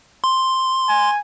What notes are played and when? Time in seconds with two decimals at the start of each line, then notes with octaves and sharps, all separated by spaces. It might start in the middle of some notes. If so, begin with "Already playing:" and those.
0.24 C6
0.89 G#5